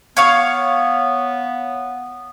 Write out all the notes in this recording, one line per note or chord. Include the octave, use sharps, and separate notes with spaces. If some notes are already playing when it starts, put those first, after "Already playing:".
B3 C#5 F5 C#6